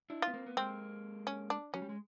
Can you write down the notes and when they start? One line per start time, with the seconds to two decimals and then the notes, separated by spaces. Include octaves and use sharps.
0.10 D4 E4
0.22 F4
0.28 B3
0.34 A#3 C4
0.46 B3
0.57 G#3 A#3 C4
1.27 C#4
1.50 D4
1.74 F#3 C#4
1.82 G3
1.89 G#3